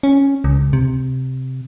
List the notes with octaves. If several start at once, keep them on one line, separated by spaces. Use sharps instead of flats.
C#4
C#2
C3